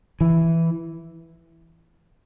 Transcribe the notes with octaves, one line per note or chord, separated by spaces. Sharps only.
E3